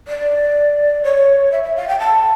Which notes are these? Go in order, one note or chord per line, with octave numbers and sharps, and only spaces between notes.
D5
C#5
E5
E5
F5
G5
A5